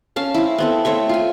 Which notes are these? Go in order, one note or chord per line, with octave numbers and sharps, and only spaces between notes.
C#4 F5 A5
C4 E4
B3 C4 A4
A3 C4 C#5 E5
F4 G#5